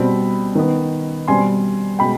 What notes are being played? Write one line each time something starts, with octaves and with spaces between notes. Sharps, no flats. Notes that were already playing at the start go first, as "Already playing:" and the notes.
Already playing: B2 G3 C4 B5
D#3 B3
B2 G3 C4 G#5 C6
B2 G#3 G5 B5